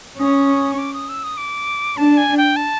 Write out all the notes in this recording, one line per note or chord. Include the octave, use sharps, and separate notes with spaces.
C#4 D#6
C#6
D6
D#6
E6
D#6
D6
D4 A5
G#5
G5
A5